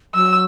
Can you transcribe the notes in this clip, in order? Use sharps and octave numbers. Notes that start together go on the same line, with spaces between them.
F#3 E6